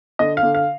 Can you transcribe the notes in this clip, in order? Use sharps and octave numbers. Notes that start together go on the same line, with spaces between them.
D3 D#5
F5
D3
F5